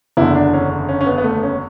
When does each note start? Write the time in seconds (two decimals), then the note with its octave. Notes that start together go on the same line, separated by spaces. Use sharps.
0.17 F#1 E2 D3 E4
0.35 D4
0.54 C#4
0.88 C#4
1.01 C#4
1.06 B3
1.18 B3
1.24 A3
1.43 C#4